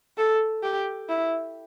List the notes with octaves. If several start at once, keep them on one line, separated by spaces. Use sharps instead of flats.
A4
G4
E4